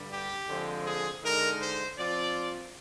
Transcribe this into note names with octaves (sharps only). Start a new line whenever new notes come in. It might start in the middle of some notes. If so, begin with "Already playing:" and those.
Already playing: G2 D3 G3
G4
D3 F3 G#3 C4
G#4
D3 G#3 D#4 A#4
C5
F3 C4 F4 D5